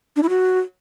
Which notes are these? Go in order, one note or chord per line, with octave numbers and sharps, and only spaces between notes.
D4
E4
F#4